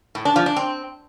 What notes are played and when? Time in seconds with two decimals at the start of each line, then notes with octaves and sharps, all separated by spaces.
0.15 A2
0.25 D4
0.36 F3
0.46 D4
0.56 C4